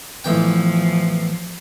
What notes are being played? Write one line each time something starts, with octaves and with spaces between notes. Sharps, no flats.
A1 E2 F3 G5